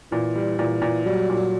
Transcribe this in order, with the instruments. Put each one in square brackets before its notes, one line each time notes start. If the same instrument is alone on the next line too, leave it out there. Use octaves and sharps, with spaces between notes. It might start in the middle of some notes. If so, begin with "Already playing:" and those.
[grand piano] A#2 [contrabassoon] E3
[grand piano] G3
[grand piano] A#2 [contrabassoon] E3
[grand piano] A#2
[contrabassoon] F#3 [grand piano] G3
[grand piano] A#2
[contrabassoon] F#3